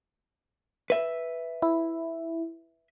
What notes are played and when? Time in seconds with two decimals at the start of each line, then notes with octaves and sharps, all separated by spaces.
0.90 B4 E5
1.62 E4